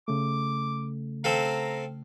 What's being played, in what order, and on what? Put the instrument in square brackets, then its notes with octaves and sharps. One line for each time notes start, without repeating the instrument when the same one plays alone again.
[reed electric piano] C#3 A3 [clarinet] D6
[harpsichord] C4 A4 F5 [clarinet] A#5